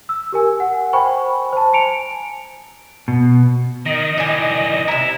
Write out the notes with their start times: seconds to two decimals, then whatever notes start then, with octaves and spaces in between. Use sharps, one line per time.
0.09 E6
0.32 G4 A#4 G#5
0.60 F#5
0.93 C5 G5 G#5 B5 C#6
1.53 C5 A5
1.72 G#5 A#5 C#7 D7 F7
3.08 B2
3.86 D#3 D#5
4.18 D#3 E3 D5 G#5
4.88 C3 E4 A#5